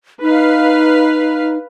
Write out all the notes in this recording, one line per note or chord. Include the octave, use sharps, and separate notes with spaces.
D#4 B4 F5